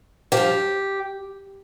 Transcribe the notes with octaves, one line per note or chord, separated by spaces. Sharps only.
G2 F3 G4